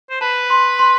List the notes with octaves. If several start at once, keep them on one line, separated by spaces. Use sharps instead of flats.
C5
B4 A5
C6
C6